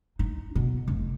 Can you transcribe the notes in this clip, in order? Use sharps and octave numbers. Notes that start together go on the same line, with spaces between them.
D#4
B2
F1